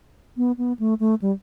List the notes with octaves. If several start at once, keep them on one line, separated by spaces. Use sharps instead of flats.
B3
B3
A3
A3
G3